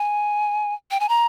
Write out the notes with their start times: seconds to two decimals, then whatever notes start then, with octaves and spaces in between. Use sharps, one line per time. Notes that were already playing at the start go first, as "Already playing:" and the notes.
Already playing: G#5
0.91 G5
1.00 G#5
1.09 A#5